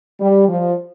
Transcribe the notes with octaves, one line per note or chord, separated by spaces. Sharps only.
G3
F3